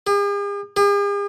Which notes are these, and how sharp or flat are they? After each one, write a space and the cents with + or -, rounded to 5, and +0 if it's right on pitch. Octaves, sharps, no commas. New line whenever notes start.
G#4 -45
G#4 -45